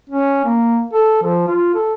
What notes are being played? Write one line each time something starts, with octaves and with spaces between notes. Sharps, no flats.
C#4
A#3
A4
F3
F4
A4